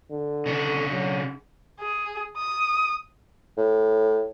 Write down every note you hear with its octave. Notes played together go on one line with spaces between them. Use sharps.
D3
C#3 D4
F#3
G#4
D#6
A2